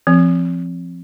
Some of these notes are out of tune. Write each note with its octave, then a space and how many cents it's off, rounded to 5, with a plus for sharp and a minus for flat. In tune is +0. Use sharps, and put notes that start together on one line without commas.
F3 -20 C4 +0